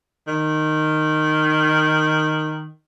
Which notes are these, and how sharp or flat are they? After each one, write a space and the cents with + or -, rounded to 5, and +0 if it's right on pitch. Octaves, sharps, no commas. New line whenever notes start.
D#3 -10